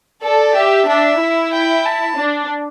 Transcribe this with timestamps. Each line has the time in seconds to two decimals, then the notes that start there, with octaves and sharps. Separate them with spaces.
0.23 A4 D5
0.55 G4 E5
0.88 D4 E5
1.20 E4
1.53 G5
1.85 A5
2.18 D4